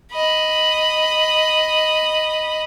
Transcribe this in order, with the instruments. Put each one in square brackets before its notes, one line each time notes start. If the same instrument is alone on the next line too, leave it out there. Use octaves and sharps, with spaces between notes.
[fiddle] D#5 B5